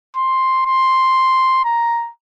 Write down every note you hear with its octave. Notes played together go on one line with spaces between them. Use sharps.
C6
C6
A#5